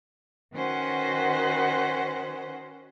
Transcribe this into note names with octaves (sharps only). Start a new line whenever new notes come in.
D#3 C#4 F#4 B4 C5 F#5